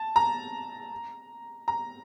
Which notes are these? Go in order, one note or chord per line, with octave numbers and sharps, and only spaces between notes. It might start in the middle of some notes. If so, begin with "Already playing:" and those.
Already playing: A5
A#5
A#5